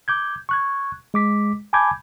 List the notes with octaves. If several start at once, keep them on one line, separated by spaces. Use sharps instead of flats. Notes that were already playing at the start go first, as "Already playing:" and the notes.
D6 G6 G#6
C#6 F#6 G#6
G#3 D6 B6
G#5 A5 B5 D6 G6 G#6